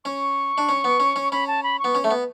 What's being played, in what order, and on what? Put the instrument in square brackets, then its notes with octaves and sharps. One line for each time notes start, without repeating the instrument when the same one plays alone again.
[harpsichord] C#4 [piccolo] C#6
[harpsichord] D4
C#4
B3
C#4
C#4
[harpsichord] C#4 [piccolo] B5
[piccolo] A5
B5
C#6
[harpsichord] B3
C#4
A3
B3